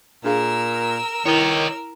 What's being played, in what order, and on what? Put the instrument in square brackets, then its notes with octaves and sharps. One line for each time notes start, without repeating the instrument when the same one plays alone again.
[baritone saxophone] A#2 [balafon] D4 G#4 F5 [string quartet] A#4 E6
[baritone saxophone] D#3 [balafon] E4 [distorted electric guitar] C#5 D#5